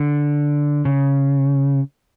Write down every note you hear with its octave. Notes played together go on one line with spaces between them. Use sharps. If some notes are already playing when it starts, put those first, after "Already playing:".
Already playing: D3
C#3